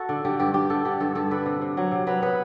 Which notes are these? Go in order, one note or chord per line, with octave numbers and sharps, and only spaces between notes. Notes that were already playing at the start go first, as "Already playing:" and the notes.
Already playing: F#4 A4
D3
D3 G4
G2 G4
G2 G4
D3 A4
D3 G4
G2 A4
G2 A4
D3 B4
C3
C3
F#3
C3
F#3 B4
B3 B4